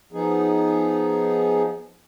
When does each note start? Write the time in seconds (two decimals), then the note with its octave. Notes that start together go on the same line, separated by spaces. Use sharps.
0.13 F3 B3 D#4 G#4